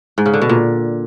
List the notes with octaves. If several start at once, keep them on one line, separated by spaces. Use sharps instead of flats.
G#2
C#3
D3
B2
A#2